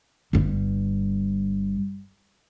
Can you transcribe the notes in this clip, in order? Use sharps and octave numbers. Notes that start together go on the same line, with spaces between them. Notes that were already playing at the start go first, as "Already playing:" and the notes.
G1 G2